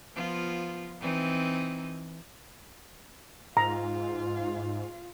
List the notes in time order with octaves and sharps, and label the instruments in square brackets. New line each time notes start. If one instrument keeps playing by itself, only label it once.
[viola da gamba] F3 B3 F4
E3 C4 D#4
[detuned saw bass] G#2 [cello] F4 F5 [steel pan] A#5